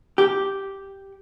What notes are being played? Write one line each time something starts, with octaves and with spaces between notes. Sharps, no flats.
G4